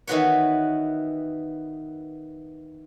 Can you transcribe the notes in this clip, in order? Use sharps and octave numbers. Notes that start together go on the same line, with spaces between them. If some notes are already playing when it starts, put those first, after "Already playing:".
D#3 E3 B3 F#4 B4 C#5